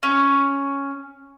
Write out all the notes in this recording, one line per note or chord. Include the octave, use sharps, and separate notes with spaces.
C#4